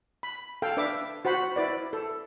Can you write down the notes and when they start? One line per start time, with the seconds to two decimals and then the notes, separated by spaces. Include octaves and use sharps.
0.23 B5
0.62 A4 F5 G5
0.77 D4 B4 E5 D6
1.25 F#4 C5 F#5 B5
1.56 E4 B4 D5
1.93 A4